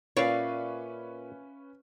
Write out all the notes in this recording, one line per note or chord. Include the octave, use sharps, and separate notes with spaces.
A#2 C#4 B4 C#5 D5 E5 F5 C#6